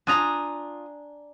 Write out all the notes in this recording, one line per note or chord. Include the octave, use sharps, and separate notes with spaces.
D4 F4 G#5 A#5 D#6